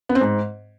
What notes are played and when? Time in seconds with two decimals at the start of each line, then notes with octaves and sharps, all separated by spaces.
0.09 B3
0.15 C4
0.21 G#2